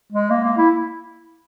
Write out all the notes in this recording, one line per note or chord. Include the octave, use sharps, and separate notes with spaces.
G#3
A#3
A#3
E4